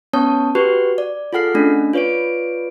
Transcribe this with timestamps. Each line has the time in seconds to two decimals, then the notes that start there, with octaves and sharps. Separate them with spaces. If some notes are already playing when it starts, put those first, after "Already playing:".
0.13 B3 C#4 C#5 A5 C#6 D#6
0.55 F#4 G4 B4 C#6 F#6
0.98 D5
1.33 F4 G#4 A4 F#5 F6 C7
1.54 A3 C#4 D4
1.93 F4 B4 C#5 D5 D7